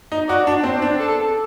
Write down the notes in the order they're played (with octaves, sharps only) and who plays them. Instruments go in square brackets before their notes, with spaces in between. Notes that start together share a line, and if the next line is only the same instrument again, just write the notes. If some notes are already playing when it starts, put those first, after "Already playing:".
[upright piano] D#4
[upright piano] F#4 [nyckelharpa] D5
[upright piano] D4
[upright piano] C4 [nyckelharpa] C5
[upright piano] D4
[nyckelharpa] A4